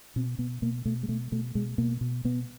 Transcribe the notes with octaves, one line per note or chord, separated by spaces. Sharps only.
B2 C4
B2 B3
B2 A#3
B2 A3
G#3
B2 A3
B2 A3
B2 G#3
B2 A#3
B2
B2 B3